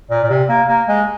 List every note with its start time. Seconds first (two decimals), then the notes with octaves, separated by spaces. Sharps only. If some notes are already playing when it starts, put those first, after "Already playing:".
0.10 A#2
0.23 A#2
0.30 C3
0.49 A#3
0.68 A#3
0.88 G#3